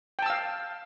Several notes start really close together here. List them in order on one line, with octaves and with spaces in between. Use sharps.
G5 A5 E6 F5